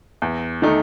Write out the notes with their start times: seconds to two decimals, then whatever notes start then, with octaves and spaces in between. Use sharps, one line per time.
0.22 E2
0.62 D#3 A3 D#4